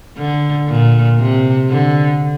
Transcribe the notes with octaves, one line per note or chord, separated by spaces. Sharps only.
D3
A#2
C3
D3